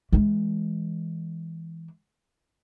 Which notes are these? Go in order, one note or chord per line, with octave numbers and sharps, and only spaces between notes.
E3 G#3